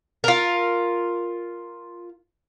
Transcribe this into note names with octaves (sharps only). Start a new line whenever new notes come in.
F4 A#4